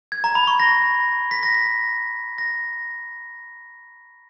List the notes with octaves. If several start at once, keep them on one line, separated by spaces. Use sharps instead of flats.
G#6
A#5
B5
C#6
A#6
B6
A#6
A#6
A#6